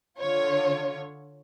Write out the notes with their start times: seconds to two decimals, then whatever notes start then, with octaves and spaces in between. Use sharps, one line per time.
0.19 D3 F4 C#5